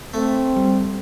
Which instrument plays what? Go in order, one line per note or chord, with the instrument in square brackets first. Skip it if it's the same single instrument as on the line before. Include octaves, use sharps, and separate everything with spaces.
[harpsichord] A3 [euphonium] C4
[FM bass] G3